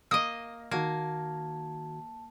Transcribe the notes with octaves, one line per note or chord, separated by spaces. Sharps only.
A#3 D#5 D#6
D#3 A#3 F#4 A5 G#6